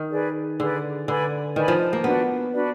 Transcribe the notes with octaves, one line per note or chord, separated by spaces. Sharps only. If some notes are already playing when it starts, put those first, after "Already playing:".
Already playing: D#3
G#4 B4 D5
D3 G#4 B4 D5
D3 B4 D5 G#5 B5
D#3 B4 D5 G#5 B5
F3
A#3
B3 D4 F#4 B4 D5
D4 F#4 B4 D5